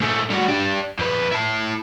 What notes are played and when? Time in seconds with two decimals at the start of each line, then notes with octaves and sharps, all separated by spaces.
0.01 G#2 A3
0.30 G3 F#4
0.49 D4 G4
0.99 F2 B4
1.32 E4 A5